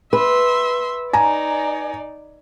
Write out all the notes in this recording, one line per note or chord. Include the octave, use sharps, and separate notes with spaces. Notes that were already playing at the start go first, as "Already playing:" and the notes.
B4 E5 C6
D#4 D5 G#5 A#5